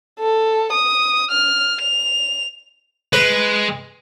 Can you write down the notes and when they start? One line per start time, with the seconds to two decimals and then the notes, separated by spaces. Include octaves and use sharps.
0.20 A4
0.72 D#6
1.31 F6
1.81 F7
3.13 G#3 B4